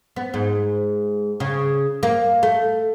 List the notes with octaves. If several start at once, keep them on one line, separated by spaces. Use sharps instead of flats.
B3
G#2
C#3
A#3
A3